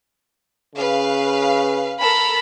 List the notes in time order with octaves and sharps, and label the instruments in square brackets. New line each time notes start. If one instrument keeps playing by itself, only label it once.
[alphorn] C#3 [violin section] B4 F5
[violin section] A4 A#4 A#5 [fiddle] B5